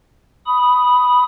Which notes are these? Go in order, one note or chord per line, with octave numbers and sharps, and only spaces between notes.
B5 D#6